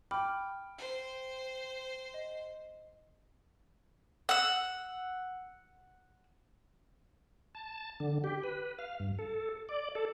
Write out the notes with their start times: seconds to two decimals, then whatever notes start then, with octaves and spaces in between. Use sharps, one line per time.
0.11 G5 B5 D6 F6
0.78 C5
2.14 D#5
4.29 F#5 E6
7.55 A5
8.00 D3
8.24 G4
8.44 B4
8.79 F5
9.00 G2
9.19 A4
9.69 D5
9.95 A4